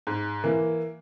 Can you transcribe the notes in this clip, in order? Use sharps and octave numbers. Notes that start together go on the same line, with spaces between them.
G#2
E3 A#3